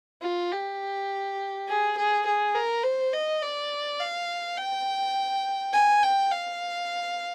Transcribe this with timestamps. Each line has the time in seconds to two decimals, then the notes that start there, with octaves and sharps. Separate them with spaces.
0.22 F4
0.52 G4
1.67 G#4
1.97 G#4
2.26 G#4
2.54 A#4
2.83 C5
3.13 D#5
3.42 D5
4.00 F5
4.57 G5
5.73 G#5
6.03 G5
6.31 F5